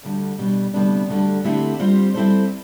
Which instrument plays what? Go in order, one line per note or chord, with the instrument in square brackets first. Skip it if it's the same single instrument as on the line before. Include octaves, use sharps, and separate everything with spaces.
[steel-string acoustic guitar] D2 D3 G3
B2 G3 D4
D2 C3 G3 B3 D4
D2 D3 G3
D3 A3 C4 E4 G4
G3 C4 F4 C5
G3 C4 E4 A4 C5